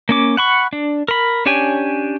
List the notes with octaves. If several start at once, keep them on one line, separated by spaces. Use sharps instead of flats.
A#3 C#4 D6
F#5 B5 C#6
D4
A#4 B5
C#4 D4 G4 C#5 G#5